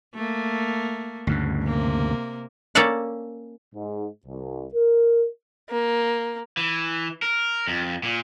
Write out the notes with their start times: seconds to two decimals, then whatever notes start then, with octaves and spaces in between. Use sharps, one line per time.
0.15 A3 A#3
1.27 D2 G2 C#3
1.65 C3 A#3
2.75 A#3 C#4 A4 D5 F5 F#5
3.75 G#2
4.26 C2
4.74 A#4
5.70 A#3
6.57 E3
7.22 A#4
7.67 F2
8.03 A#2